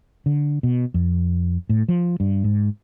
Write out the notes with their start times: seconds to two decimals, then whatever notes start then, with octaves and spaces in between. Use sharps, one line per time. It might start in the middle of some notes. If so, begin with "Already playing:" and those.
0.26 D3
0.63 B2
0.94 F2
1.69 A2
1.88 F3
2.20 G2
2.44 G#2